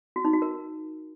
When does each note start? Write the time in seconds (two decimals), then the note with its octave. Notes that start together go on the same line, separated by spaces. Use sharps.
0.16 F#4
0.25 D#4
0.33 F#4
0.42 A#4